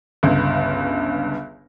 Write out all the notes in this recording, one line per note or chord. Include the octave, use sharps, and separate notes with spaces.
G1 C#2 G2